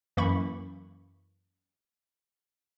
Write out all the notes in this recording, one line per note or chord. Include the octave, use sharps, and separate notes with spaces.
F#2 E3 A#3 B5 C#6